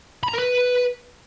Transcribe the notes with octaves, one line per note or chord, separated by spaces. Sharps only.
B5
A#5
A#4
B4